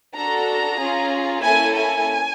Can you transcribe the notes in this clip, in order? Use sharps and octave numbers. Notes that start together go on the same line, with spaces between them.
D4 F#4 A4 A#5
C#4 F4 G#4
A#3 C#4 E4 A4 G#5
G#5